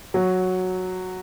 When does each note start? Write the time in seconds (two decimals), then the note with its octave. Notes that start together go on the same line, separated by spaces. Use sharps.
0.14 F#3